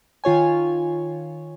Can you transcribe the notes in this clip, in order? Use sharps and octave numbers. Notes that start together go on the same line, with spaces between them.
D#3 F4 C#5 G#5